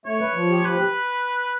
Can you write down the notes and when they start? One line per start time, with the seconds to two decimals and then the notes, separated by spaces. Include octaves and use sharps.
0.06 A3 C#5
0.20 B4
0.34 F3
0.50 G4
0.65 F3 B4